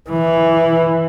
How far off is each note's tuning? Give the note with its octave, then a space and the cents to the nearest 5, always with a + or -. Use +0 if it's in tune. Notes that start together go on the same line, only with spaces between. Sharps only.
E3 +0